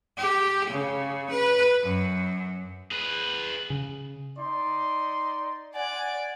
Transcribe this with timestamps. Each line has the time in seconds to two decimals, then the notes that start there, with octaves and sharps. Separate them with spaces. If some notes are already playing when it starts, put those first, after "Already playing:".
0.17 G4
0.70 C#3
1.30 B4
1.83 F#2
2.91 G#4 B4
3.70 C#3
4.38 D#4 D5 C6
5.75 D5 F#5 G#5